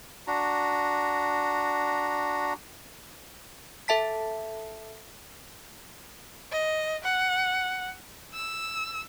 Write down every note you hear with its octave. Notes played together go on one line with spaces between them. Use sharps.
D4 F#4 A#5
A4 E5 A5 B6
D#5
F#5
E6